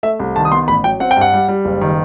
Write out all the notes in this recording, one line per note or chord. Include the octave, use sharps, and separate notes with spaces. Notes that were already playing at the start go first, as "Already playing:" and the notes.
A3 E5
C2
D#3 A5
D#6
B3 C6
A1 B5
F#3 G5
C4 F#5
G5
G2 F#5
G3
G3
F#1
D#3